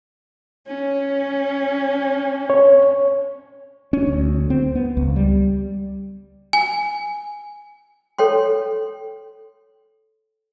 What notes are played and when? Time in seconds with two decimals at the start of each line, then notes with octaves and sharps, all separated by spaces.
0.67 C#4
2.50 C#5
3.93 C#4
4.07 D2
4.50 C4
4.75 B3
4.97 C#2
5.16 G3
6.53 G#5
8.18 A4 C#5 G5 C6